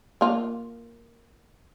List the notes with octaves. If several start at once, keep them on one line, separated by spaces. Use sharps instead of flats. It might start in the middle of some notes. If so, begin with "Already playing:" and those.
A#3 F4